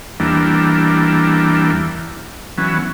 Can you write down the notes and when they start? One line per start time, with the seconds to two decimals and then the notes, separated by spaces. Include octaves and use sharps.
0.20 E2 E3 G3 A#3 D4
2.58 E3 F#3 B3 C#4